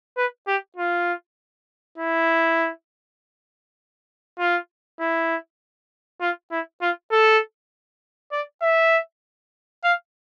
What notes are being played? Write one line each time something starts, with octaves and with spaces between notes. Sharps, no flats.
B4
G4
F4
E4
F4
E4
F4
E4
F4
A4
D5
E5
F5